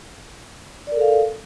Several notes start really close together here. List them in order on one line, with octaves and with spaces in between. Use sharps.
D5 A#4 A4 F5